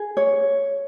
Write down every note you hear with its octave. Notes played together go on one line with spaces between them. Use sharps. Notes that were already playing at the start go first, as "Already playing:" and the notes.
Already playing: G#4
C#5